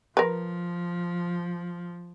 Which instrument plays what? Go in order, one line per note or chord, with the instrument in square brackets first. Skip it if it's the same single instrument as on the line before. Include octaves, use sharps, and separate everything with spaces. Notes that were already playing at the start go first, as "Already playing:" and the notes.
[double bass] F3 [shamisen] A#4 B4